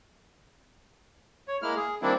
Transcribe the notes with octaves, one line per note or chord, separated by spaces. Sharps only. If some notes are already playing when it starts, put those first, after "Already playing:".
C#5
G#3 A#3 E4 F6
G#4
D#3 G3 A#3 C4 D4 E4